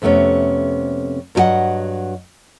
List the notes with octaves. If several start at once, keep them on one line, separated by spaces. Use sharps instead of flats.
F2 C3 A3 B3 C#4
G2 F#3 E4 G4 D#5 F#5